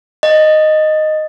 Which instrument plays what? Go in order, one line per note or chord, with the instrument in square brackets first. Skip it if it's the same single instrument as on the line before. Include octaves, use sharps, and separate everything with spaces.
[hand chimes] D#5